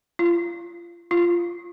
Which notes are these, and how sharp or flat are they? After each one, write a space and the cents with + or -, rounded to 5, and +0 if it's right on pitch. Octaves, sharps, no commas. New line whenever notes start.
F4 -30
F4 -15